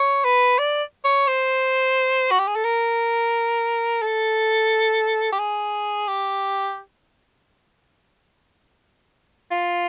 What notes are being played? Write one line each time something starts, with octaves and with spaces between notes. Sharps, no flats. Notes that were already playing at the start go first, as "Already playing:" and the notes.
Already playing: C#5
B4
D5
C#5
C5
F#4
G4
G#4
A4
A#4
A4
G4
G#4
G4
F4